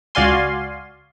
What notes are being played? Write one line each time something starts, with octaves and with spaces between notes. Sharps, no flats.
C#2 F#4 D5 F5 G#5 C6